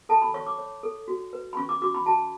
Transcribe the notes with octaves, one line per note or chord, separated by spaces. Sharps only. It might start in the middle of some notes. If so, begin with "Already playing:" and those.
A4 A5
B5
C#5 C#6
D6
C#5
A4
F#4
B4
B5
C#4 C#6
D6
F#4 D6
B5
F#4 A5